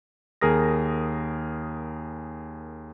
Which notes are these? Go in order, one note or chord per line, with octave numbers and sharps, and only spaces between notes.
D#2 G#4 A#4 D#6 A#6